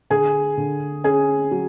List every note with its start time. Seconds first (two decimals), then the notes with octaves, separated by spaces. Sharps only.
0.10 D3 G#4 G#5
0.57 D3
1.04 C#4 G#4 G#5
1.51 F#3